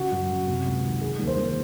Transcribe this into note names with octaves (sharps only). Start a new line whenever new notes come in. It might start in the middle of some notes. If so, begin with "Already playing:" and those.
Already playing: C#3 F#4
F#2
F#2
C3
C#2
D#3
D#3 G#4
D#2
C5
D#2